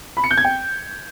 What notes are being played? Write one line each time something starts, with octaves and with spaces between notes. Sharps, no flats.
B5
C#7
G6
G#6
G5